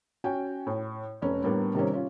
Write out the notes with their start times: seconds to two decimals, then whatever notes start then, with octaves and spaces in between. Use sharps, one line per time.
0.24 C#4 F#4 G5 G#5
0.67 A2
1.22 F1 C#4
1.43 A2 G3 A#3 B3 D4
1.75 C3 D#3 G3 A#3 C4 C#4
1.93 C#4 F4